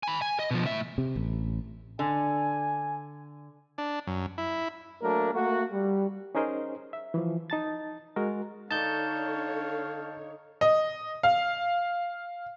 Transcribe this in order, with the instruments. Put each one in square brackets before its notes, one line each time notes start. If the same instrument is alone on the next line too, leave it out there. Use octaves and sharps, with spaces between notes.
[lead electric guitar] G#5 B5
G#5
D#5
B2 F3
A2 E5
[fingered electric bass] C3
A1
[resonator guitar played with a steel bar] D3 [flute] G#5
[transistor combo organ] D4
F#2
E4
[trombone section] F#3 A3 A#3 D4 A#4
A3 A#3 F#4
G3
[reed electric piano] C#4 D#4 G#4 A#4 C5 D#5
E5
E3 F3
D#4 A5 A6
G#3 F#4 A#4
[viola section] D3 C#5 [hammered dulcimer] D#4 D5 [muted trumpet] F5 [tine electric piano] A5 G6
[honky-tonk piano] D#5
F5